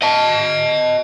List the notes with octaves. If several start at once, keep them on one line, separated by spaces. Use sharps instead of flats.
D#5 A5